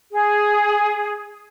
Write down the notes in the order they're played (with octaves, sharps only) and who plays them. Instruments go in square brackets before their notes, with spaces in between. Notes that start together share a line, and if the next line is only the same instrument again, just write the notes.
[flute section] G#4